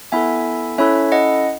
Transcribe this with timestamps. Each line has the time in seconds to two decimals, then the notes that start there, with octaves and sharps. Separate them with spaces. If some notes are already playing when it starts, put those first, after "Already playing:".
0.12 B3 E4 A4 E5 G#5
0.78 C#4 E4 A4 C#5 E5
1.12 D#5 F#5